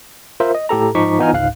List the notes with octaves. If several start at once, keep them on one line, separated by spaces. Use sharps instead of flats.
F4 A#4 C5 E5
D#5
A2 G4 A4 A#5
G#2 F3 D#4 C#6 D6 B6
E3 B3 D#4 F4 G#5 F6
G1 C#2 G#2 F5 F#6